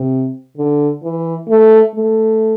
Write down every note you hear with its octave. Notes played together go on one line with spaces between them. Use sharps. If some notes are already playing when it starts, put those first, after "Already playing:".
Already playing: C3
D3
E3
A3
A3